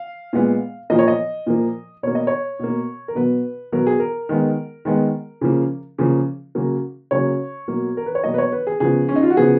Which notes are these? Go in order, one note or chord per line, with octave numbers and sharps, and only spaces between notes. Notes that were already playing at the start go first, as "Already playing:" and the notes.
Already playing: F5
A#2 G#3 B3
A#2 F3 A#3 D#5
C#5
D#5
A#2 F3 A#3
B2 A#3 C#5
D#5
C#5
B2 A#3
A#4
B2 F#3 B3 B4
B2 F#3 B3 A#4
G#4
A#4
D#3 G#3 B3
D#3 G#3 B3
C#3 F3 A#3
C#3 F3 A#3
C#3 F#3 A#3
C#3 F#3 A#3 C#5
B2 F#3 A#3
A#4
B4
C#5
B2 F#3 A#3 D#5
B4
C#5
B4
G#4
C#3 F3 B3 G#4
C#4
D#4
F4
F#4
C#3 F3 B3 G#4